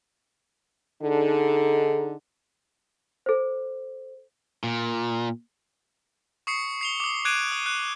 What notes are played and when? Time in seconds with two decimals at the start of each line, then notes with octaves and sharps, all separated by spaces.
1.02 D3 D#4 G#4 A4
3.26 A4 C5
4.64 A#2
6.47 C#6 D#6 C7 C#7
6.81 C7 F7 G7
7.00 D6 D#6
7.25 D6 F#6 G#6 D7 D#7
7.52 D#6
7.66 F#6